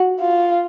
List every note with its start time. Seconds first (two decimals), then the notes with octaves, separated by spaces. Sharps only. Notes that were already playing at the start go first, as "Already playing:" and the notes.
Already playing: F#4
0.20 F4